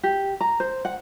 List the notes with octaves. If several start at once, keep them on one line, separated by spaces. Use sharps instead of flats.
G4
A#5
C5
F#5